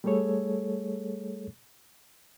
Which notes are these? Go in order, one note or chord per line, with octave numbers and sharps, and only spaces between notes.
G3 A3 G#4 A4 C#5